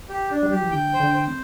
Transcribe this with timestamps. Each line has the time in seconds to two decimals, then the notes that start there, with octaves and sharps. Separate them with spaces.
0.09 G4
0.31 D4
0.43 G3
0.51 F#3 G4
0.62 E3
0.71 D3 G5
0.94 C5
1.00 D3
1.14 C5
1.28 C4